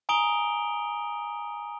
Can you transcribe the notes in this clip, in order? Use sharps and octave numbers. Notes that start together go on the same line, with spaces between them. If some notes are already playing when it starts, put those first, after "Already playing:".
G#5 A#5 D#6 D7 F7 G7